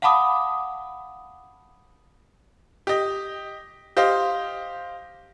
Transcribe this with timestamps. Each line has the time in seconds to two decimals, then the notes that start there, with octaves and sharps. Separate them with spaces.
0.02 F5 F#5 A5 B5 D6 D#6
2.87 G4 D#5
3.97 G4 C5 D#5 F5